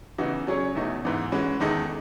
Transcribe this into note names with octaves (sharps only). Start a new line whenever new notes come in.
C#3 E3 B3 D#4 F#4
F#3 C#4 G#4 C#5
E2 B2 A3 D#4
G#2 E3 B3
E3 G#3 C#4 F#4 B4
E2 D#3 G#3 D#4 A4